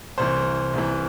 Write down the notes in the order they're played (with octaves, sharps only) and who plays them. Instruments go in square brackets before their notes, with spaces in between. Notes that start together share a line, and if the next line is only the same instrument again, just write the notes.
[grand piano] C2 C3 E3 C5
C2 C3 E3